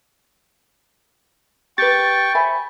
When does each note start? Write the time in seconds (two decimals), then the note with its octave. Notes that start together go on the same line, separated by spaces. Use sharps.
1.78 G4 B4 G5 C#6 A6
2.35 C5 E5 G#5 B5